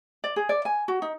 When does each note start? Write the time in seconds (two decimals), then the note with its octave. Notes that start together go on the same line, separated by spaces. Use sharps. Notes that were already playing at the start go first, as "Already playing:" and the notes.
0.24 D5
0.36 G#4
0.49 D5
0.65 G#5
0.88 F#4
1.02 D#4